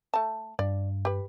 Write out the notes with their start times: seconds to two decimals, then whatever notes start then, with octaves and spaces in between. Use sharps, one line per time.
0.14 A3 A5
0.59 G2 D5
1.05 G4 B4